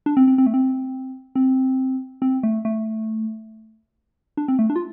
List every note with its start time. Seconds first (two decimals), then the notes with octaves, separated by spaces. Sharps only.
0.06 D4
0.17 C4
0.28 C4
0.38 C4
0.46 A3
0.54 C4
1.36 C4
2.22 C4
2.43 A3
2.65 A3
4.37 D4
4.48 C4
4.59 A3
4.70 D4
4.76 F4